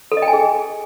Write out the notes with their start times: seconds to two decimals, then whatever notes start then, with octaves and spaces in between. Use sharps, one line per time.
0.12 A4
0.17 D#5
0.22 G5
0.28 G#5
0.33 G#4